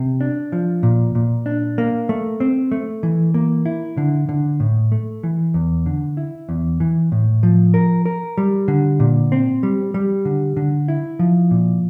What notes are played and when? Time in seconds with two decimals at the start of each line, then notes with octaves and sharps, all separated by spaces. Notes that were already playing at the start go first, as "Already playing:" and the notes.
Already playing: C3
0.21 D4
0.52 F3
0.83 A#2
1.15 A#2
1.46 D4
1.78 A#3
2.09 A3
2.40 C4
2.72 A3
3.03 E3
3.34 A#3
3.66 E4
3.97 D3
4.29 D3
4.60 A2
4.92 A3
5.23 E3
5.54 E2
5.86 D3
6.17 E4
6.49 E2
6.80 E3
7.12 A2
7.43 F3
7.74 A#4
8.06 A#4
8.38 G3
8.68 D3
9.00 A#2
9.32 C4
9.63 G3
9.94 G3
10.25 D3
10.57 D3
10.88 E4
11.19 F3
11.51 A#2